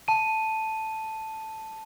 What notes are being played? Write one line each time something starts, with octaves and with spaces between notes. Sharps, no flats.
A5 D#7